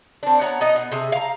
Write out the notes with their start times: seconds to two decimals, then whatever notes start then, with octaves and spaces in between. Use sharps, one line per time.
0.23 C4 D4
0.41 B3 C#5 F#5 A#5
0.60 B2 B3 D#4 D#5
0.76 B2
0.92 C3 G#4
1.12 F5 A#5